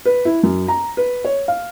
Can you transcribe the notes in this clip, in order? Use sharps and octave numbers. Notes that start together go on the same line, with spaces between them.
B4
E4
F#2
A#5
B4
C#5
F5